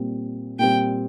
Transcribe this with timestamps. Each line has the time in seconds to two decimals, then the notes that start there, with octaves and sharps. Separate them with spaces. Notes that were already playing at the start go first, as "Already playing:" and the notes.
Already playing: A#2 G3 C4
0.59 A#2 G3 C4 G5